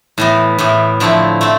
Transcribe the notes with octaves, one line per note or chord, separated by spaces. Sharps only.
A2 E3 B3
A2 E3 B3
D3 F3 A3 C4 E4
A3 C4